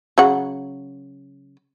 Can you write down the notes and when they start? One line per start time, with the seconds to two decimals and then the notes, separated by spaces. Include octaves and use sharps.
0.18 C#3 F#3 F#5